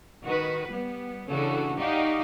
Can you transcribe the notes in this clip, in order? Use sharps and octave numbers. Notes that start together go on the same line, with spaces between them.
D#3 F#4 B4
G3 B3
C#3 E3 C#4 D4 F#4 A4
D#4 F#4 G4 D5 D#5 F5